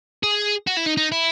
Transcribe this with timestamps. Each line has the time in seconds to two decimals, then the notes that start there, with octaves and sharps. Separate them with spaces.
0.23 G#4
0.67 F#4
0.77 E4
0.87 D#4
0.97 D#4
1.12 E4